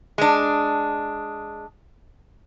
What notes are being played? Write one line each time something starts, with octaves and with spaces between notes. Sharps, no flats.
G#3 D4